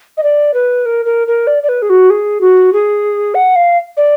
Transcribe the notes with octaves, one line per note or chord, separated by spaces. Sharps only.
D#5
D5
B4
A#4
A#4
A#4
D5
D5
B4
G#4
F#4
G#4
F#4
G#4
F#5
F5
D5